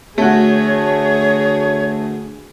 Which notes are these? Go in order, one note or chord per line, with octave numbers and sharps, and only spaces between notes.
D2 A3 F#4 G#4 C#5